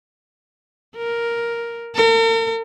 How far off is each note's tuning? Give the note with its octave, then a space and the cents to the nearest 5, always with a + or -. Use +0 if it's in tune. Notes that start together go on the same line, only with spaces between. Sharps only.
A#4 +5
A#4 -45